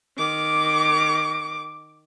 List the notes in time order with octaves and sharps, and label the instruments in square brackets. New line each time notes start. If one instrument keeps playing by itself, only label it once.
[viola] D#3 D6